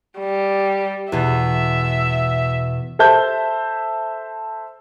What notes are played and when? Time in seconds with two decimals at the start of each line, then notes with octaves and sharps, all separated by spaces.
0.19 G3
1.12 E2 B2 E5
2.99 A4 C5 E5 A5 G6